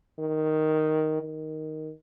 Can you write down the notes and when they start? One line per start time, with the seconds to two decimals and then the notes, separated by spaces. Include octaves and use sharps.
0.20 D#3
1.21 D#3